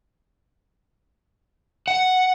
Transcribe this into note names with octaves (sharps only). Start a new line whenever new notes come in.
F#5